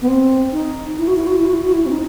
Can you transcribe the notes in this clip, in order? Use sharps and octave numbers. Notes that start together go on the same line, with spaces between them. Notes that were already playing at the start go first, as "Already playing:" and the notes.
B3
C4
D#4
E4
F#4
E4
F#4
E4
F#4
E4
F#4
E4
C4
D#4